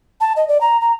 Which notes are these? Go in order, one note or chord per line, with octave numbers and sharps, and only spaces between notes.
A5
D#5
D5
A#5
A#5